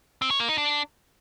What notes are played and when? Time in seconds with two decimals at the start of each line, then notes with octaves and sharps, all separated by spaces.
0.22 C4
0.31 C#5
0.40 A#3
0.49 D#4
0.58 D4